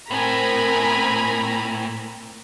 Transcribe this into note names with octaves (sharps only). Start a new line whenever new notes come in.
A2 C4 A#4 G#5 A#5 B5